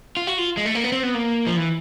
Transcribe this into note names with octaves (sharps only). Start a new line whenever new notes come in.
F4
F#4
F4
G#3
A3
A#3
B3
C4
B3
A#3
F3
E3